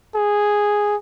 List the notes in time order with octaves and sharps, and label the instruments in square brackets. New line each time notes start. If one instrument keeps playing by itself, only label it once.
[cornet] G#4